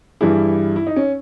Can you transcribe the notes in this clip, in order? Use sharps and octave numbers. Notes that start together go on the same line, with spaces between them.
G2 E3 G3 E4 G#4
E4
D#4
C#4